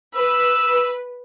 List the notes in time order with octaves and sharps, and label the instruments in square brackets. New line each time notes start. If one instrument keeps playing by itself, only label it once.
[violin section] B4 [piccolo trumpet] E6